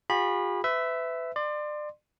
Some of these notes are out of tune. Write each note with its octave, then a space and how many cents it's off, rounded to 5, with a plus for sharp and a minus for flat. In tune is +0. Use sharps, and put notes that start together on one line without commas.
F4 +45 G#4 -45 B5 -15
B4 +35 E5 +0
D5 +30 C6 +0